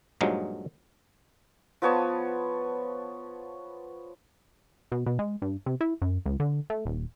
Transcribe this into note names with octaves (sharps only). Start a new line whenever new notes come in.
G2 A#2 F3 F#3 G#3 D#4
F3 B3 C#5 A5
B2
B2
G#3
G2
C3
E4
F#2
C#2
D3
A3
D#1